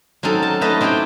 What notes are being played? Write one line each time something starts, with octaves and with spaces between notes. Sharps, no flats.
F#3 C4 C#4 D#4 A4
A5
A3 D#4 B4 D#5 A5
C4 D#4 E4 G4 G5